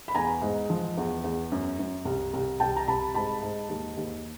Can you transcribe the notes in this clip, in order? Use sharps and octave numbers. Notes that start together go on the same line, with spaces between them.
B5
E2 G#5 A#5
G#2
F3
E2
E2
F#2
F#2
C2
C2
C2 G5 A5
A#5
C2 A5 B5
G#2 A5 B5
G#2
D#2
D#2